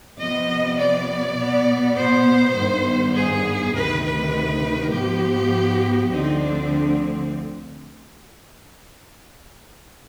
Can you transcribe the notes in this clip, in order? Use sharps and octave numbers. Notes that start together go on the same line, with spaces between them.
C3 F3 B3 D#5
D5
B2 B3
C5
G2 D#3 B3
G#4
D2 C3 D#3 B4
B4
G#2 F3 B3 G4
D2 D3 F3 C4 D#4
D4